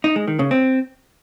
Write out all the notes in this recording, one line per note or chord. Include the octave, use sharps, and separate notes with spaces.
D#4
G#3
D#3
C#3
C4